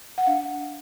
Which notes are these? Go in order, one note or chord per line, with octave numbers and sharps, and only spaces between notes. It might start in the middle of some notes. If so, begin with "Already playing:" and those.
F#5
D4 F5